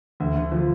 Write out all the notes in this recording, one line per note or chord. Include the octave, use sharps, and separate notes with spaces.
D2
D2
F3